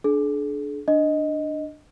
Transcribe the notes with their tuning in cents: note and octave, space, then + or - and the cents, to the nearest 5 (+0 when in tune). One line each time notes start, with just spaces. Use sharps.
D4 +0 G#4 +45
D4 +10 D#5 +0